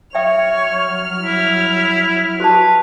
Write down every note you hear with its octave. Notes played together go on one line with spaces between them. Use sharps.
F#3 C#5 E5 G5 F6
E4
F#4 G4 B4 A5